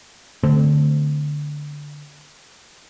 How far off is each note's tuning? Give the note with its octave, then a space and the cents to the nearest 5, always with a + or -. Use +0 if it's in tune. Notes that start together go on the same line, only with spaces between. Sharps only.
D3 +0 A3 +0 C4 -25